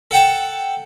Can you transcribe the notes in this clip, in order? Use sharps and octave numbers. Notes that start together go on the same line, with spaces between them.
A4 F#5 G5 A5